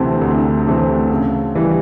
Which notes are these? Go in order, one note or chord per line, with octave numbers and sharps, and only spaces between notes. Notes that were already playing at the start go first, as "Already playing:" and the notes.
Already playing: D2 C3 E3 A3 C4
D2
C3 E3 A3 C4
C#3
E3 G3